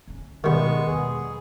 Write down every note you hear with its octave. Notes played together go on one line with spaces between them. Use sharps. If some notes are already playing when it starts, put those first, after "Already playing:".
D3 C#4
G#2 B2 D#3 G3 G#3 B3 C#6
E2 F#3 G#4